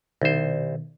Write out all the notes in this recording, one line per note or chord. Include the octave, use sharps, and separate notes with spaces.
C2 B2 D#3 C5